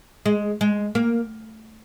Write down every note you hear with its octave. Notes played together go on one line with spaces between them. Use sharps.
G#3
G#3
A#3